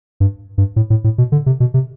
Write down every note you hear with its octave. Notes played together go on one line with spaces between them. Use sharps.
G2
G2
A2
A2
A2
B2
D3
C3
B2
C3